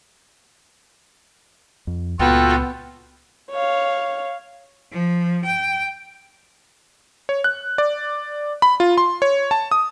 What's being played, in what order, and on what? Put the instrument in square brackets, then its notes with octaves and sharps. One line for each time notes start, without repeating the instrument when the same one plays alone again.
[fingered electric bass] F2
[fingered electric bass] C#2 A#2 [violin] B3 [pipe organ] F4 F#4 A4 [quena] G5
[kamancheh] C#5 F5
[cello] F3
G5
[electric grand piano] C#5
F#6
D5
B5
F4
C6
C#5
A5
D#6